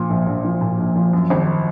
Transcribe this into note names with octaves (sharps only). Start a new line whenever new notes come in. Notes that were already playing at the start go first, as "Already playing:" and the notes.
Already playing: A#2 F3
A#1
A#1
F3
A#2
A#1
F3
F#2
G#1